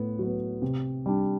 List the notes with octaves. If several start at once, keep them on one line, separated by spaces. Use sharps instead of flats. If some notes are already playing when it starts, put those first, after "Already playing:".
Already playing: A2 B3
F#3 B3
C3
G3 D4